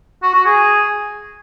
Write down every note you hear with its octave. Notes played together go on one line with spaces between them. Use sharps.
F#4
F#4
G#4